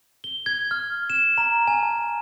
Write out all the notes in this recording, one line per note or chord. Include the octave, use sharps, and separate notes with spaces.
G7
G#6
F6
E7
A#5
G#5
A5